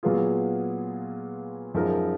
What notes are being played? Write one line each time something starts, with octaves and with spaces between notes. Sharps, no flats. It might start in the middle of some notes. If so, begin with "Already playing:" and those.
A#2 F#3 B3 F4 G#4
F#2 F3 G#3 D#4 A#4